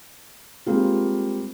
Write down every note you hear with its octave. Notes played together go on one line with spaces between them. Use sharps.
G3 G#3 A#3 C4 F4